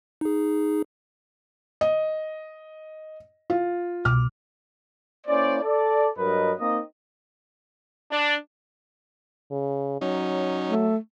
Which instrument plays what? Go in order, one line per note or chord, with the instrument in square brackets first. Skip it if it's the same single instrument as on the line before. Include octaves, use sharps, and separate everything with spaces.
[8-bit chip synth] D#4 G#4
[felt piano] D#5
F4
[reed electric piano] C2 B2 D6 [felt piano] F6
[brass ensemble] A#3 C#4 E4 C5 D5
A4 D5
G2 F#3 A#4 B4 D#5
A#3 C4 D#4 D#5
[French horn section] D4
[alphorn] C#3
[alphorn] F#3 [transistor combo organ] C#4 D#4
[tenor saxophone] A3